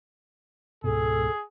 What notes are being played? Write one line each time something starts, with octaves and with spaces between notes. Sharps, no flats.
C#2 G#2 B2 G#4 A4